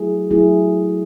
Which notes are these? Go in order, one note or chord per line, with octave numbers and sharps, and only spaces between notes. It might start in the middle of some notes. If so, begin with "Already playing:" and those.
Already playing: F#3 A3 E4 G#4
F#3 A3 E4 G#4